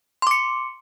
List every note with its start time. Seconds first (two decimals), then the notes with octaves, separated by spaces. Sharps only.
0.22 C6
0.27 D6
0.31 C#7